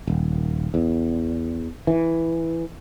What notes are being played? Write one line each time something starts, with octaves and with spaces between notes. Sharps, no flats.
D#1
E2
E3